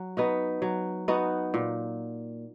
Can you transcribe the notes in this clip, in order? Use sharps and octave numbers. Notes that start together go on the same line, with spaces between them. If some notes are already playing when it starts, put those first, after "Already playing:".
Already playing: F#3
B3 D#4 F#4
F#3
B3 D#4 F#4
A#2